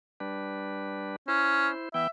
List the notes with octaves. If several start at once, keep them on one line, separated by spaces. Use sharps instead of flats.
G3 D4 B4
C#4 E4 C5
E3 B3 E5 G5